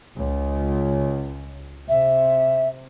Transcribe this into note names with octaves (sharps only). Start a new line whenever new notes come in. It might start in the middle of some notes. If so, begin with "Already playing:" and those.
C#2
C3 E5